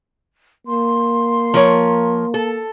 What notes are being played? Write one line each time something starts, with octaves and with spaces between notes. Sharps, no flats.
A#3 C6
F3 A#4 C#5
A4